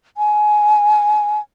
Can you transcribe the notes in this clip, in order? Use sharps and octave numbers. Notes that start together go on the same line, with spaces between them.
G#5